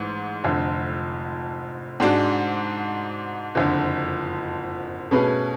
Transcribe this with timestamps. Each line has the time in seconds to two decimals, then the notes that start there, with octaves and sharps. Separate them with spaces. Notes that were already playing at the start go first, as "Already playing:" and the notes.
Already playing: A1 G#2
0.44 F1 F2 D3
2.00 G#2 G#3 D4 F#4
3.55 F#1 F2 D3
5.11 B2 A3 C#4 G#4 B4